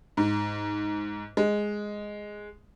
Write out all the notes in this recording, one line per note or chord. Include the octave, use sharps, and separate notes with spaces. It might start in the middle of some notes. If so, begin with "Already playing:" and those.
G#2
G#3